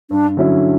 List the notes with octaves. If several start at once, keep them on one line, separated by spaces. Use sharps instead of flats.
G2 D4
D3 F#3 C#4 E4